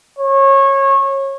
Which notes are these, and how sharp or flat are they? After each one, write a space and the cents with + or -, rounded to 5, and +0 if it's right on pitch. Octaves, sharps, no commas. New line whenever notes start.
C#5 -25